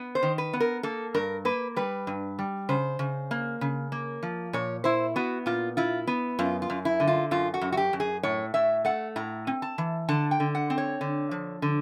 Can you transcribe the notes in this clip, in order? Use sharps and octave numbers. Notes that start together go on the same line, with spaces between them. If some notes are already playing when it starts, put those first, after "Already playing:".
Already playing: B3
C5
D#3
B4
B3
A#4
A#3 A4
G2 A#4
A#3 B4
G3 B4
G2
G3
C#3 C5
C#3
A#3
C#3
A#3
F3
A#2 C#5
E4 C5
B3 F#4
A#2 F4
E4 F4
B3
F#2 F4
F4
F#2
E4
D3
F4
F#2 F4
F#4
F#2
F#4
G4
F#2
G#4
A2 C#5
A2 E5
A3 F#5
A2 A#5
C4
A5
E3
D3 A5
G5
D3
F#5
C4
C#5
D3
F3
D3